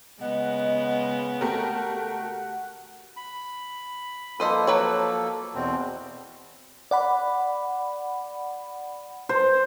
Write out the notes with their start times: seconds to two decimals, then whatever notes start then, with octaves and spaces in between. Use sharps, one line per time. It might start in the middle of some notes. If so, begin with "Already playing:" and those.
0.21 C#3 G#3 B3 D#5 F#5
1.41 A3 F#4 G4 A#4
3.17 B5
4.40 F3 A#3 A4 B4 C5 D#5
4.67 F#3 B4 C#5
5.55 E2 B2 C4
6.91 D5 F#5 B5
9.29 C5